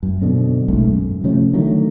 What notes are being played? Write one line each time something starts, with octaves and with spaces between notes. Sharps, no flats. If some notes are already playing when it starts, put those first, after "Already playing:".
F#2
F#2 B2 D3 C4
B1 G#2 C#3 A3
F#2
C3 F3 A3 C#4
D3 D#3 F#3 A3